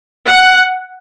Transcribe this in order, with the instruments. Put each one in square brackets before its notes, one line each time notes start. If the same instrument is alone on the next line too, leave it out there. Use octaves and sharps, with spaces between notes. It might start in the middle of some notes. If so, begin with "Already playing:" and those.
[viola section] F#5